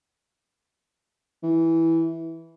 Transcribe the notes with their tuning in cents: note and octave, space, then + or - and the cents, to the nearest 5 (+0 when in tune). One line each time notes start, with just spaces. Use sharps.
E3 -10